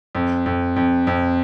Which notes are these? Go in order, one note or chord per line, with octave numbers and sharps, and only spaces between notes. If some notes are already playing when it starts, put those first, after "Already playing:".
F2
F2
F2
F2